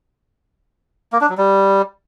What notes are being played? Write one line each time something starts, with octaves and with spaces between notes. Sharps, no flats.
A#3
D4
F#3
G3